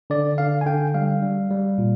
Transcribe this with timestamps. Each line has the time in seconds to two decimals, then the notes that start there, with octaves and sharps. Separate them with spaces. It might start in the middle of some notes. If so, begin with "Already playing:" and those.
0.10 D3 D5
0.38 D3 F5
0.61 G#5
0.66 D3 G5
0.94 G3 F5
1.22 G3
1.51 G3
1.78 A#2